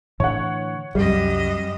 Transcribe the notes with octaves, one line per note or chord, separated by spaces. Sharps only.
A2 D3 E3 C#5 F#5
C2 F#2 G3 D#5